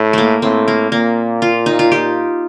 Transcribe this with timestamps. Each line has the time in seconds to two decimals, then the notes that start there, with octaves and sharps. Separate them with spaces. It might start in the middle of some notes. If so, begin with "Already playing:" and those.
Already playing: A2
0.13 A3 A#3
0.42 A2 C4
0.68 A#3
0.92 A#2 A#3
1.42 F4
1.66 D#4
1.79 F4
1.92 G4